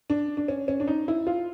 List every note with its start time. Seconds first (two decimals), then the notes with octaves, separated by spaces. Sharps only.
0.10 D4
0.37 D4
0.48 C#4
0.68 C#4
0.80 D4
0.88 D#4
1.08 E4
1.27 F4